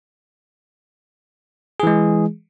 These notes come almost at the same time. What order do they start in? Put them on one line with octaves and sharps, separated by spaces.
G#4 E3 G#3